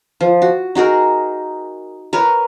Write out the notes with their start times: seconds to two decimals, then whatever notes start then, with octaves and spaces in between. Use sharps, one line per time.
0.21 F3
0.42 F#4
0.75 D#4 F#4 G#4 A#4
2.13 A#4 B4 C#5